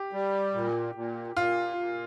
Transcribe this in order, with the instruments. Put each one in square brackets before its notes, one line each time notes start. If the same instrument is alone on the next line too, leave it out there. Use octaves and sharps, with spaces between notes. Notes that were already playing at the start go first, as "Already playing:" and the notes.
Already playing: [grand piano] G4
[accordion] G3
A#2
A#2
[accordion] A#2 [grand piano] F4
[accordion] A#2